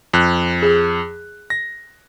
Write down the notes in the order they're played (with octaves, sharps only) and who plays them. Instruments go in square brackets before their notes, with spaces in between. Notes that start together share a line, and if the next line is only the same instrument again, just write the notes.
[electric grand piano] F2 F#6
[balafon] G#4
[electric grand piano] A#6